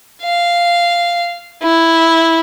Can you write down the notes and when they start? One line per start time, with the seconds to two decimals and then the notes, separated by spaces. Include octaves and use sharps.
0.23 F5
1.62 E4